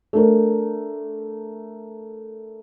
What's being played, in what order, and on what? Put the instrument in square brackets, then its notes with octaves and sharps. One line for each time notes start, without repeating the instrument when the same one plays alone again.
[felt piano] A3 D4 A#4